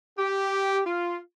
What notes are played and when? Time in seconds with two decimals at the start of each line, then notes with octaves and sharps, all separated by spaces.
0.18 G4
0.86 F4